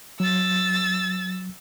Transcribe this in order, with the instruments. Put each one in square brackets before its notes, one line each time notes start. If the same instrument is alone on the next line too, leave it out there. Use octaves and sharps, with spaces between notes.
[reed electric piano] F#3 [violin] E6 A6